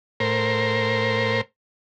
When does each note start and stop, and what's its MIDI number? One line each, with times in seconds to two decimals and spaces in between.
0.20 1.41 45
0.20 1.41 70
0.20 1.41 72